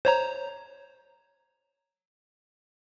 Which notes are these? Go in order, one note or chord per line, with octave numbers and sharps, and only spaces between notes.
C5 C#5 A#5